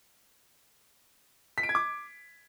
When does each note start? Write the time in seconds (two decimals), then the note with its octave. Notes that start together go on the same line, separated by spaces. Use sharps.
1.58 B6
1.63 D7
1.69 G#6
1.75 D6